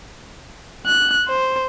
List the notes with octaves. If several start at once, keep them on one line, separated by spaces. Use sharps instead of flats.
F#6
C5